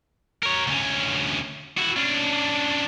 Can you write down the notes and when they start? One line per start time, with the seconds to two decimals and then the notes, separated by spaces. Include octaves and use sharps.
0.43 A#4 C#5
0.67 D2 C#4
1.78 E4 F#4
1.97 C#4 D4